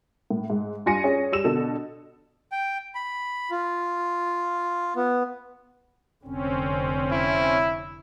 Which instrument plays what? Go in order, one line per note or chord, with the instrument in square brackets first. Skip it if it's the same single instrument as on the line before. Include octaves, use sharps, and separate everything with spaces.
[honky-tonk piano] A2
G#2
G2 F4 G#5 A#6 C#7 D#7
C#4 G#4
G3 E6 E7
B2 D3 A4
[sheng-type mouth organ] G5
B5
F4
B3
[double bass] F1 D3 [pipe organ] C4 C#4
[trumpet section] E4